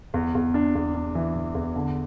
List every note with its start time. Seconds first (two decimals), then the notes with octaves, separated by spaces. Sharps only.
0.14 E2
0.35 E2
0.54 D4
0.75 E2
0.94 D4
1.15 E3
1.36 E3
1.55 E2
1.76 D3